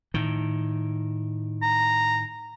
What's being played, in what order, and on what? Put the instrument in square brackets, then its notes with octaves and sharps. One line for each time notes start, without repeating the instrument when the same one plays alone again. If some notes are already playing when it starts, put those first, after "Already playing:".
[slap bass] A2 D#3
[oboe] A#5